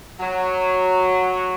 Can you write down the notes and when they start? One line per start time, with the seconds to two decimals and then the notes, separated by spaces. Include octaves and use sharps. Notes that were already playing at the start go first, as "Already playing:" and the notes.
0.20 F#3